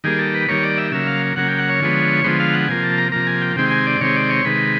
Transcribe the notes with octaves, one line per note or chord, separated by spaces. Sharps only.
D#3 G3 A#3 G#4
A4
B4
D#3 G3 A#3 C#5
D5
E5
C#3 F#3 A#3 E5
F5
C#3 F#3 A#3 F#5
G5
F#5
C#5
D3 F3 G#3 B3
D3 F3 G#3 B3 C5
F5
F#5
C3 F3 A#3 G#5
A5
A#5
C3 F3 A#3 A#5
G#5
G5
C3 D#3 G#3 C4 G5
G#5
D5
C3 D#3 G#3 C4 C#5
D5
C#5
C3 D#3 G#3 B4